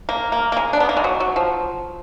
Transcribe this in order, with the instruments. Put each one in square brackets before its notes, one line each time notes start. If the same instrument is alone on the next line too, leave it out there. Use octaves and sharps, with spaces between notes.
[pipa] A#3
A#3
A#3
G#3
D4
B3
A#3
G#3
F#3
F#3
F3